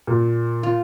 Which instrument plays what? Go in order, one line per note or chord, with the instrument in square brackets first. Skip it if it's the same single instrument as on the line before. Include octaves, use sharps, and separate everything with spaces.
[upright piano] A#2
[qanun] F4